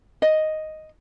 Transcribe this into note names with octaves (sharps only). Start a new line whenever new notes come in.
D#5